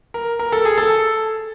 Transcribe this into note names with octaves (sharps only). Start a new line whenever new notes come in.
A#4
A#4
A4
G#4
A4